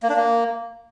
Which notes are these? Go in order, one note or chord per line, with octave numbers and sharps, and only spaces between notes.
A#3
D4
A#3